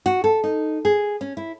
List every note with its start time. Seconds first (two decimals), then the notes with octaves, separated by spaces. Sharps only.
0.06 F#4
0.24 A4
0.44 D#4
0.85 G#4
1.21 C#4
1.37 E4